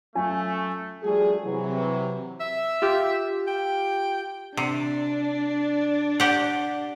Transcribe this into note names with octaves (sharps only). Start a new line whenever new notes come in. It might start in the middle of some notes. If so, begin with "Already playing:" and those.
F#3 A3 C#4 F4 G#5
F3 G3 A3 D4 F#4 G#4
C3 E3 F#3
E5
F4 G4
G5
C3 D4 D5
G4 F#5